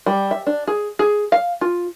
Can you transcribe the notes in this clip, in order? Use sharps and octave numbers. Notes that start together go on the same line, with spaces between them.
G3
E5
D4
G#4
G#4
F5
F4